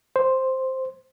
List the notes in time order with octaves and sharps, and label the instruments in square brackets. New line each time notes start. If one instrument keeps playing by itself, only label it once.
[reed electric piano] C5